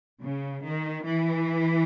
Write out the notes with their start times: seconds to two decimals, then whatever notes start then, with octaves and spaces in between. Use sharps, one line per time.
0.23 C#3
0.65 D#3
1.05 E3